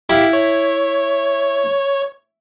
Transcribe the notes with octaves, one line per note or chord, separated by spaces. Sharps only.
E4 G4 F5 B5
C#5